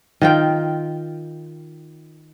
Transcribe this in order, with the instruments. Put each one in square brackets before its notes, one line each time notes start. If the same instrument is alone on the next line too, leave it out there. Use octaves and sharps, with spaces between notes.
[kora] D#3 F4 G5